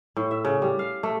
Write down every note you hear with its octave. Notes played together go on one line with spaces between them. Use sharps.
A2
E5
C#3
G3
F5
A3